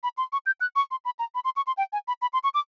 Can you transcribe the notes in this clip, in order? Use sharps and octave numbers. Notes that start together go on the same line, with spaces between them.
B5
C6
C#6
G6
F#6
C#6
C6
B5
A#5
B5
C6
C#6
C6
G5
G#5
B5
B5
C6
C#6
D6